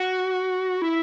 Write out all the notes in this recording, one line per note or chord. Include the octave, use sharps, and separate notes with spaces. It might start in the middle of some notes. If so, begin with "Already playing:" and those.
Already playing: F#4
E4